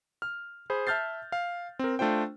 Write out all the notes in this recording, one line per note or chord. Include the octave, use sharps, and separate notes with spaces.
F6
G#4 C5 B5
E5 A5 F6 G6 A6 C7
F5
C4 A#4
A3 D4 F4 C5 G5